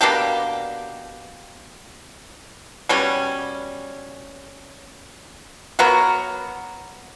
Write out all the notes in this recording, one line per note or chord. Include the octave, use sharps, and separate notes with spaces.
B2 A#3 D4 G4
B2 G3 C#4
F#3 B3 F#4 A#4